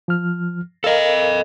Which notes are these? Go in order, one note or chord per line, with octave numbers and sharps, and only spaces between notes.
F3 F6
A4 A#4 D#5 F5